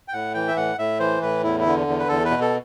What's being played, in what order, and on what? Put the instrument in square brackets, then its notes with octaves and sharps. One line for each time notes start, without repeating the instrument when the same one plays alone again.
[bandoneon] G5
A2 F#5
E3 G5
E5
A2 F#5
A2 E5
E3 C5
A2 B4
E2 E4
E4
D3
E2
B4
E2 A4
B4
B2
A4